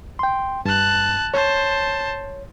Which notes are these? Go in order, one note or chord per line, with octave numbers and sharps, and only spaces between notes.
G5 C6
G2 A5 F#6
C5 C#5 A5